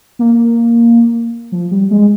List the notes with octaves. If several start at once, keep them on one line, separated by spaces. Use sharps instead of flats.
A#3
F3
G3
G#3